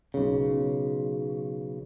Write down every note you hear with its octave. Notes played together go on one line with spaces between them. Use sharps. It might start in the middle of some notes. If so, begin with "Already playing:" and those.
B1 C#3